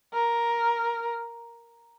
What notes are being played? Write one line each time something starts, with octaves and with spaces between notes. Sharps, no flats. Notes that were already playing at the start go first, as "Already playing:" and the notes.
A#4